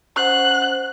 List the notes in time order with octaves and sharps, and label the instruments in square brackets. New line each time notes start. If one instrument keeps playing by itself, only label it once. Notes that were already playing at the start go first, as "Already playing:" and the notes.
[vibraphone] C#4 C5 F#5 [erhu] F#6